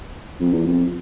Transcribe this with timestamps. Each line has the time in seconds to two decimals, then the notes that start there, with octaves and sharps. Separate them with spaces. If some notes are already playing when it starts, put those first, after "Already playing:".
0.41 F2
0.53 E2
0.65 F2